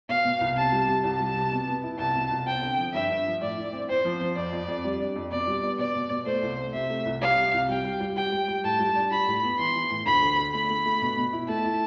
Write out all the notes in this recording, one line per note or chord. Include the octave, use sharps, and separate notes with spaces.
B2 F5
B2
C2
C3 A5
G3
C3
C2 A5
G3
C3
B2
B3
E4
C2 A5
B2
C2
C4 G5
D3
F3
G2 E5
G2
F3
A2 D5
E4
C4
C4 C5
F3
F3
F2 D5
F2
F2
G3
D4
F2
B2 D5
G3
B3
B2 D5
B2
B2
A3 C5
C2
A3
C3 E5
A3
C2
G3 F5
C3
C2
G3 G5
G3
G3
G3 G5
G3
G3
A2 A5
G3
D4
G3 B5
A2
B3
E3 C6
E3
A2
D2 B5
D3
D3
A3 B5
A3
A3
B2
B2
E4
A3 A5
E4